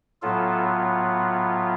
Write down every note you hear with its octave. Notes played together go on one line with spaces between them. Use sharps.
A2 F#3 B3 F4 A4